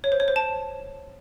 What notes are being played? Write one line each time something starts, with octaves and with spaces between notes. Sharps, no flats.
C#5
C5
C#5
C5
A5